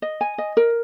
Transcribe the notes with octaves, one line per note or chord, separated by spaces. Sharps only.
D#5
G#5
D#5
A#4